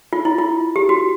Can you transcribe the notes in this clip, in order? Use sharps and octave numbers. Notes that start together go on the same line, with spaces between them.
F4
E4
F4
G4
F#4